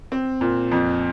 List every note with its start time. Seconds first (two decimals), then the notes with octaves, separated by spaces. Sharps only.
0.12 C4
0.41 A#2
0.72 F2